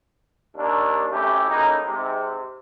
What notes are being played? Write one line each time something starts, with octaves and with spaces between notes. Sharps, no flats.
D#2 D4
C2 F#2 E3 A3 G4
A2 C#3 A#3 D#4
G#2 C3